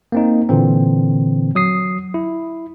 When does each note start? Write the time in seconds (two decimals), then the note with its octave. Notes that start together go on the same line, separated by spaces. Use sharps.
0.12 A#3 C4 D#4
0.49 A#2 D3 E3 C4
1.55 F#3 D#6 C7
2.14 E4